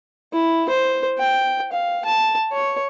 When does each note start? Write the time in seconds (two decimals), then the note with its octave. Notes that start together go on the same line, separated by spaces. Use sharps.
0.33 E4
0.69 C5
1.19 G5
1.72 F5
2.05 A5
2.52 C#5